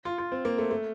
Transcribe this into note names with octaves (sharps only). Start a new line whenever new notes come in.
F4
F4
C4
A#3
A3
A3